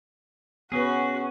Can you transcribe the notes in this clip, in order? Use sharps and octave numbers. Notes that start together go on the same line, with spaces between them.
B3 C#4 F#4 G#4 B4